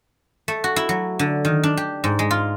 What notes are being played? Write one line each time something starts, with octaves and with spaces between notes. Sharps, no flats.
A3
F#4
E4
F#3
D3
D#3
D4
G4
G#2
G#3
F4